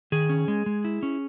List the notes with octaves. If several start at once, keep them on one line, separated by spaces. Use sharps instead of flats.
D#3 G#4
C#4
G#3
G#3
E4
C#4